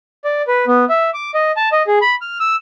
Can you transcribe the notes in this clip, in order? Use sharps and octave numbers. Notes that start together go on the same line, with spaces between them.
D5
B4
B3
E5
D6
D#5
A5
D#5
G#4
B5
F6
E6